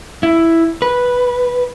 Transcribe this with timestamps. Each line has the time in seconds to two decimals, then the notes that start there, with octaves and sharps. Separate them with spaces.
0.23 E4
0.82 B4